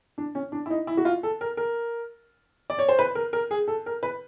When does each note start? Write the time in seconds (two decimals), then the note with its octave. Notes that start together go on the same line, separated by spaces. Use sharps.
0.18 D4
0.35 C#4
0.52 D4
0.66 E4
0.70 D#4
0.87 E4
0.97 F#4
1.05 F4
1.23 A4
1.41 A#4
1.57 A#4
2.70 D5
2.79 C#5
2.89 C5
2.99 B4
3.15 A#4
3.33 A#4
3.51 G#4
3.68 A4
3.86 A#4
4.03 B4